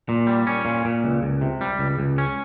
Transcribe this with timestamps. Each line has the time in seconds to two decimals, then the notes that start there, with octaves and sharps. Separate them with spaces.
0.09 A#2
0.27 G3
0.47 C#4
0.65 A#2
0.85 A#2
1.04 C#2
1.23 C#2
1.41 C3
1.61 G3
1.79 C#2
1.99 C#2
2.18 C#4